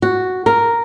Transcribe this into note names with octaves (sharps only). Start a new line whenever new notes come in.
F#4
A#4